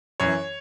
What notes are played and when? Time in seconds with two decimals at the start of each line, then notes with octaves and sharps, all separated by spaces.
0.20 F#2 E3 C#5